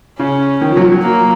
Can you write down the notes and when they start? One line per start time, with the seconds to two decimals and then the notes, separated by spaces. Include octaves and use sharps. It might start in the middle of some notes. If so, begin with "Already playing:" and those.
0.20 C#3 C#4
0.61 D#3
0.71 F3
0.77 F#3
0.81 F3
0.92 F#3
1.02 A#3